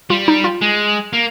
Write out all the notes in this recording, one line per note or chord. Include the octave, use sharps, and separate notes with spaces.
G3 F4
D#4
F4
G#3
A#3